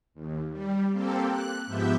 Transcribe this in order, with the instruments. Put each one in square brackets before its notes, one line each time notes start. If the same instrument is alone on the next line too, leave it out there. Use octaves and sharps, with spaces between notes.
[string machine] D#2
G3
A#3 C4 G4 A4
F#6
G#2 F3 B3 G4 E5 G5